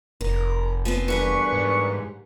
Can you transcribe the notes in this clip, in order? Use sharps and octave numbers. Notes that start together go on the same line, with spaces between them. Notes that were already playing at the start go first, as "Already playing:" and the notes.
F1 A#4
F3 B3 C4
E2 A#2 G3 D4 G#4 B4 C#6
G#2